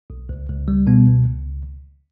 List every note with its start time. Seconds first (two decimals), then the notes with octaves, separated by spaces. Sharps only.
0.10 B1
0.29 C#2
0.49 C#2
0.68 G3
0.87 B2 B3
1.06 C#2
1.25 C#2